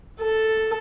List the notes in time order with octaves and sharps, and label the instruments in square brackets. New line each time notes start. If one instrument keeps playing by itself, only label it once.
[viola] A4